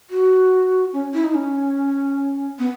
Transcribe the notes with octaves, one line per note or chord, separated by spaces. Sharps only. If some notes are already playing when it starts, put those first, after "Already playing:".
F#4
C#4
E4
D#4
C#4
B3